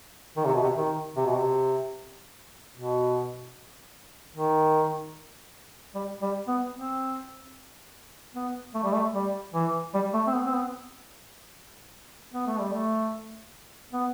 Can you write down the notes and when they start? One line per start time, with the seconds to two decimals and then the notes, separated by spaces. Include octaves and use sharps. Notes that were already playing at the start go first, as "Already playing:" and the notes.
0.37 D#3
0.46 C3
0.54 B2
0.63 C3
0.77 D#3
1.17 C3
1.26 B2
1.35 C3
2.76 B2
4.36 D#3
5.95 G3
6.22 G3
6.48 B3
6.75 C4
8.35 B3
8.74 A3
8.83 G3
8.93 A3
9.14 G3
9.54 E3
9.94 G3
10.14 A3
10.27 C4
10.33 B3
10.46 C4
10.54 B3
12.33 B3
12.47 A3
12.59 G3
12.72 A3
13.93 B3